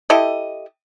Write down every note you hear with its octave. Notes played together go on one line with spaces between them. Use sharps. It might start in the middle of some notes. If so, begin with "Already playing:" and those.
E4 G4 A4 D#5